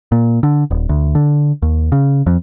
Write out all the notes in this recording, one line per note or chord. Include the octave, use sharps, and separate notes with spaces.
A#2
D3
D#1
D2
D3
D#2
C#3
F2